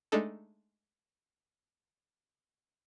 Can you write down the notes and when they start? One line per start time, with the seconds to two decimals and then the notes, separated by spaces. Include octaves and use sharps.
0.12 G#3 A3 D4 D#4 A4